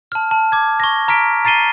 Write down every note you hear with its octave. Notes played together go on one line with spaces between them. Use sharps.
A5 F6
A5
D6 G#6
C#6 A#6
A#5 F6 B6 D7
A#5 A6 C7 D#7 G7